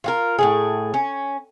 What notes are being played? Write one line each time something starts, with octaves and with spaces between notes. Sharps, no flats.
F4 F#4 A#4
A2 C3 G#4
C#4